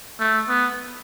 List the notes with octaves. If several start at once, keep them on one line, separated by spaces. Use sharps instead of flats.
A3
B3